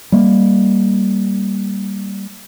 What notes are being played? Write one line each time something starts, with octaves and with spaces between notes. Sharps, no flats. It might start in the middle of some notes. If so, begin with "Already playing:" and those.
G3 A#3